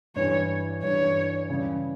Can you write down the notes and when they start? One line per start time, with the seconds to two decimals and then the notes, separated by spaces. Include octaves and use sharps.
0.16 G2 E3 G3 C#5
0.83 G2 E3 G3 C#5
1.49 C#3 E3 G3